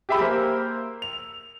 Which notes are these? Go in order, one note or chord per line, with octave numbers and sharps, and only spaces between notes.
G4 G#4 E5 G5 B5 E6
A#3 A#4 C5
F7